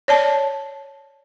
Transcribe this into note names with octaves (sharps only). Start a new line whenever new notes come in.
C#5 D5 A5